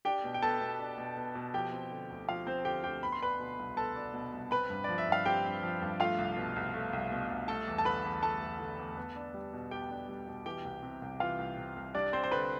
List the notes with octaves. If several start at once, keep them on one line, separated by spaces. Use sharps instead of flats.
D4 G4 G5
B2
G5
B3 A4 A5
B2
D4
B2
B3
B2
F3 G4 G5
C4
D3
D2
F3 F4 F5
C4 C5
D3 G4 G5
D2 G4 G5
B3 B5
C6
D4 B4 B5
B2
C2
B3 A4 A5
D4
B2
C2
C4 B4 B5
G2
F3 D5
E5
G2
F5
C4 G4 G5
G2
F3
G2
A3 F4 F5
C2
B2
C2
A3
C2
B2
C2
A3 A4 A5
E2
A5
D3 B4 B5
E2
A3 A4 A5
E2
D3
E2
B3
D4
G3
B2
B3 G4 G5
D4
G3
B2
E3 G4 G5
C2
C3
C2
E3 F4 F5
C2
C3
C2
G3 D4 D5
C4 C5
C5
D3 B4